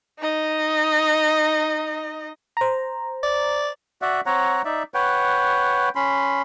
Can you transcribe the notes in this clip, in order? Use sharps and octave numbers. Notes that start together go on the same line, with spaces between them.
D#4 D#5
C5 A#5
D5
F#4 D5 E5 F#5
C4 C#5 F#5 A#5
D#4 D5 E5
B4 C#5 F#5 G5
C#4 B5 C6